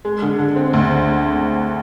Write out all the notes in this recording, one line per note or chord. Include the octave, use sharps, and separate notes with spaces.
G#3
D3
D3
C4
D2